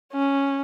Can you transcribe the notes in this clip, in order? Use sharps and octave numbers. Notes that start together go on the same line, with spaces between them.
C#4